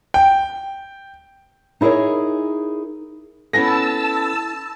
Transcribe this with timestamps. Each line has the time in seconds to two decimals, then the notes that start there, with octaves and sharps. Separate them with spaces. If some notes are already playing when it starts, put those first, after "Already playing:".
0.14 G5
1.81 D#4 E4 G#4 A#4 C#5
3.53 B3 C#4 E4 A4 G#5 A5 E6 A#6